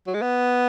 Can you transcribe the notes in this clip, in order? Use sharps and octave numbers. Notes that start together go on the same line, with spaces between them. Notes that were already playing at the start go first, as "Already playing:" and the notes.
F#3
G#3
B3